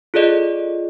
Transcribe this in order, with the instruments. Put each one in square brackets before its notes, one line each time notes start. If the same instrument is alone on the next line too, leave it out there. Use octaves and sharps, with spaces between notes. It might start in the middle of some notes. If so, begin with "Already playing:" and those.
[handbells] F4 G#4 A4 D5 D#5